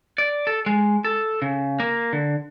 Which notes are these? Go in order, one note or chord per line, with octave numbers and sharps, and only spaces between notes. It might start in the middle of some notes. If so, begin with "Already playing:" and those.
D5
A4
G#3
A4
C#3
A#3
D3